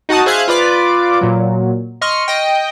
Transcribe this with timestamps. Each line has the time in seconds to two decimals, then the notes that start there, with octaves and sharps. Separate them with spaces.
0.09 D#4 F#4 F#5 A5 D#6
0.26 G#4 C5 E5 F5 F#6 G#6
0.48 F4 B4 D5 D6
1.21 A#2 F#3
2.01 D#5 C6 C#6 F6
2.28 D#5 G5